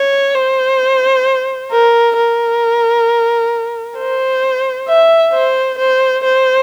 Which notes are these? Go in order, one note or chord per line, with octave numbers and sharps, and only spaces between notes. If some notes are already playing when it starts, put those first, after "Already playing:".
Already playing: C#5
C5
A#4
A#4
C5
E5
C5
C5
C5